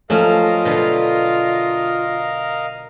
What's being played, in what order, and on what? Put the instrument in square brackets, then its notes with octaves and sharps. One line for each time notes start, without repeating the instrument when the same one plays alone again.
[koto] F3 F#3 C#4 [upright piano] A3 [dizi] F4 [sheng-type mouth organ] A#4 D#5 F5
[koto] B2 D3